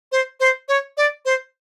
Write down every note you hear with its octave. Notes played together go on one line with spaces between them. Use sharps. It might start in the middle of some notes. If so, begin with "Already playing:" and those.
C5
C5
C#5
D5
C5